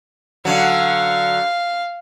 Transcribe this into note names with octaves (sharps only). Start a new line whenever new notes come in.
D3 F#3 F5